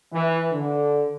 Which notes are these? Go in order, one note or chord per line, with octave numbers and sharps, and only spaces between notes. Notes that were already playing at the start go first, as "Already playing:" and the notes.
E3
D3